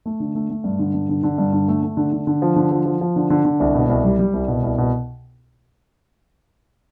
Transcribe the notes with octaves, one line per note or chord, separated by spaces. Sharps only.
A3
D3
A3
A3
G2
D3
G2
D3
D3
G2
D3
A3
A3
D3
D3
D3
F3
D3
F3
F3
F3
D3
D3
D3
C2
B2
C2
G3
G3
C2
B2
C2
B2